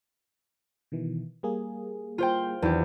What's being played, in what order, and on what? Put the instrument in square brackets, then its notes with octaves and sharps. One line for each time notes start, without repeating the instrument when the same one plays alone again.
[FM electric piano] B2 D#3 E3
G3 A#3 G#4
[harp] F4 C5 G5
[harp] E2 G4 [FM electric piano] D#3 F#3 D4